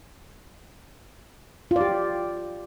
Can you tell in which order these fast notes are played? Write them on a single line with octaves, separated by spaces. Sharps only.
F4 D5 G4